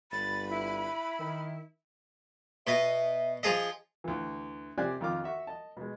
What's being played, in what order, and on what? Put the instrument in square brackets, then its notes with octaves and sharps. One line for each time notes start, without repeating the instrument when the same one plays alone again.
[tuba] G1 [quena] B5 [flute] A6
[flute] E4
[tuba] D#3
[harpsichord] B2 D#5 [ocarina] E5
[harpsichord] F3 G#4 D#5
[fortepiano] D2 E3
C3 G4 C5 D5 G#5 F#6
F2 D#3 F4 C6 D6
F#4 E5 C#6
D#5 A5
B2 G#3